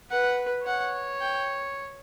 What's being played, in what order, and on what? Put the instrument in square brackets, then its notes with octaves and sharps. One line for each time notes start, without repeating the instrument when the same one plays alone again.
[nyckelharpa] B4 [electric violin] F#5
[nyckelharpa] C#5 [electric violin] F#5
[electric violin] G5